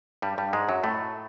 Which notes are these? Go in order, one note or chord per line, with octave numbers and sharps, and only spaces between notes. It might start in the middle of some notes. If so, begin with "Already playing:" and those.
G2 G3
G2 G3
G#2 G#3
F#2 F#3
A2 A3